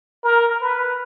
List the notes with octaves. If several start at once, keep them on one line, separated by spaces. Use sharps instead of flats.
A#4
B4